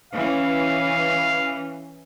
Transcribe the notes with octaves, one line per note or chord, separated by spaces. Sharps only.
E3 C#4 F5